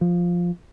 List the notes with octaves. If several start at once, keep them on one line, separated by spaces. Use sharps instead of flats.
F3